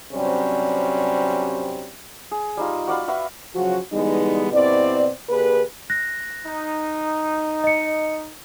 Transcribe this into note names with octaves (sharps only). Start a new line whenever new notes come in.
G2 C3 F#3 G3 C4 C#4
G#4
G3 D#4 F4
F#4 D5 F5 B5
F#4 B4 E5 F5
C#3 F3 F#3 F#4
D3 E3 G3 G#3 B3 D#4
G2 B2 C4 E4 D5
D3 A#3 G4 G#4 B4
F#6 A#6
D#4
D#5 C#7